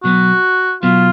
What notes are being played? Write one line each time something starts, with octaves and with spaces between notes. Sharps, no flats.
B2 F#3 B3 F#4
B2 F#3 B3 F4